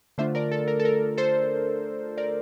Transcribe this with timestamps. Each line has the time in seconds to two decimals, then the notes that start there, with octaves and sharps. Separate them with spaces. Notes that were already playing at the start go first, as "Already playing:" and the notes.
0.18 D3 A3 D4 F4 C5 E5
0.35 A#4 D5
0.52 A4
0.68 A#4
0.80 A4
0.85 A#4
1.18 A4 C5
2.18 A#4 D5